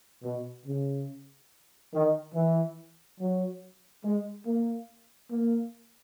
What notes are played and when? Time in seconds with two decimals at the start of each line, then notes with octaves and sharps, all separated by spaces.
0.23 B2
0.65 C#3
1.92 D#3
2.33 E3
3.18 F#3
4.03 G#3
4.45 A#3
5.30 A#3